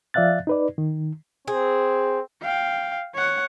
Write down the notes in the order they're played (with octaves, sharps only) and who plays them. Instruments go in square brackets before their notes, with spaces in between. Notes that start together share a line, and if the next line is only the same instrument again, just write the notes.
[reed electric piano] F3 D5 E5 F5 F#6 A6
D#4 B4 D5
D#3
[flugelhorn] C4 [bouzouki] G#4
[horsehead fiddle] F5 G5
C#5 F#5